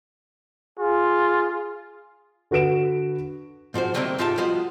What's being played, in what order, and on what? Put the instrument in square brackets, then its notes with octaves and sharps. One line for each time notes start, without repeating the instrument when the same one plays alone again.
[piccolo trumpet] F4 [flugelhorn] G#4
[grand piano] D3 F#4 B4 D7 E7
[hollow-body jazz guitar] G#2 F3 F#4 C5
C3 D#3 G3 A3 A#3 C4
G#2 D#4 F4 G4 E5 A5
F3 G3 B3 F4 F#4 D#5